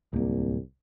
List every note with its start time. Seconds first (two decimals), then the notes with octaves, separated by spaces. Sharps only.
0.13 D1 C2 A#3